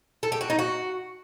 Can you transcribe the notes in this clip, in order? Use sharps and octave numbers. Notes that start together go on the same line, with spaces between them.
A4
G4
F#4
D#4
F#4